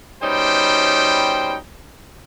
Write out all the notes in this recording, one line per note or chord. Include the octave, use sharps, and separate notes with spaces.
B2 G3 C#4 D#4 C5 G5